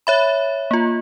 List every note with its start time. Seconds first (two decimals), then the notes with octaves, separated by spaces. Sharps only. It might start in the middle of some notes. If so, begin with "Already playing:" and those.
0.07 C#5 E5 B5
0.71 A#3 F4